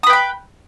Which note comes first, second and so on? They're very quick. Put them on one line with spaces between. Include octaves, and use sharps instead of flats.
D#6 B4 G5 B5